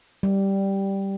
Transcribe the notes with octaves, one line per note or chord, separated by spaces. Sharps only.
G3